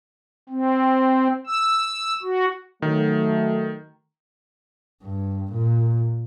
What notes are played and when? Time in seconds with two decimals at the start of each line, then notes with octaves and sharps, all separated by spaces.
0.49 C4
1.47 E6
2.22 F#4
2.82 D#3 F#3 A3
5.03 G2
5.53 A#2